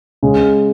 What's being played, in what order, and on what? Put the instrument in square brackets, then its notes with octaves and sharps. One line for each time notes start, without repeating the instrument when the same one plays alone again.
[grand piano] C#3 G#3